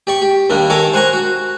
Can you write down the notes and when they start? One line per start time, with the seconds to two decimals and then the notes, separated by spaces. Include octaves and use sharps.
0.07 G4 D5 C#6
0.22 G4
0.50 D#2 D#3 G3 A#3 D4
0.70 D#3 A4 C#5 G#5 A#5 D6
0.93 C5 F#5 G#5 A#5 C#6
1.13 F#4